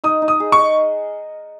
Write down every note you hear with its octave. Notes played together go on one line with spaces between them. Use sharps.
D#4 D#6
D#4
D#6
G#4
C#6
D#5